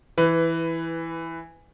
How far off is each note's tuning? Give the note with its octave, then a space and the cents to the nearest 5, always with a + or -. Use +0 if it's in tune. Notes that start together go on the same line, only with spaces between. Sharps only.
E3 +0 B4 +15